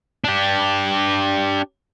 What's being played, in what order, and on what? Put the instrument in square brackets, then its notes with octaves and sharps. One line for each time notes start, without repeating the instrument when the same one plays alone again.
[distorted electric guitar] D4 G4